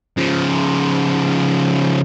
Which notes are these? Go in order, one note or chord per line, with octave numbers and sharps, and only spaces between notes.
C#3 F3